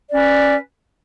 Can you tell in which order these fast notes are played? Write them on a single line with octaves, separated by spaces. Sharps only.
D5 C#4 B4